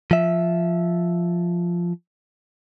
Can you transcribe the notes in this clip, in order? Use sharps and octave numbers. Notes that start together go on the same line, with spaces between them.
F3 E5